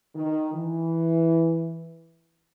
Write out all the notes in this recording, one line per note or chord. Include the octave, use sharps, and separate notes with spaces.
D#3
E3